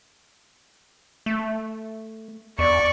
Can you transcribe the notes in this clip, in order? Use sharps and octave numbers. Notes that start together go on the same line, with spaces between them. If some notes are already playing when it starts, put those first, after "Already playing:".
A3
E2 D5 C#6